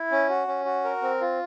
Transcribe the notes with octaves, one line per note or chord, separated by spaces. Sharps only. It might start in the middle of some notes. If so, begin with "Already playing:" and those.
Already playing: E4
C#4
F#4
C#4
F#4
A#4
C4
F4